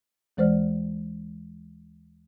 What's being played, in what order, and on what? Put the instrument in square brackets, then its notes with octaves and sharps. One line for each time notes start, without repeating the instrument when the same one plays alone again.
[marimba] D#2 E3 G#3 C5 D5 F6